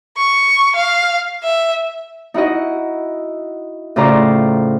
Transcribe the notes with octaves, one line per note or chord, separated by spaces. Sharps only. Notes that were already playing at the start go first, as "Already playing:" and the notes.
C#6
F5
E5
D#4 E4 F#4 D#5
A2 C#3 F4 C5 D5 A#5